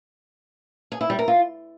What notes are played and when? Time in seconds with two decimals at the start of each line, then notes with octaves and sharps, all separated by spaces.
0.92 G#4
1.01 E4
1.10 G3
1.19 A#4
1.28 F4